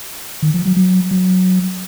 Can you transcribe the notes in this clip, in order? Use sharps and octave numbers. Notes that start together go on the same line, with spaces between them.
D#3
F3
F#3
F#3
F#3